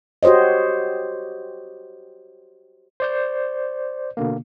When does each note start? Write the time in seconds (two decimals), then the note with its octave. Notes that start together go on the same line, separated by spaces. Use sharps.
0.23 F#4 G4 C5 C#5 D#5
3.00 C5 D5 G6
4.17 B2 D3 A#3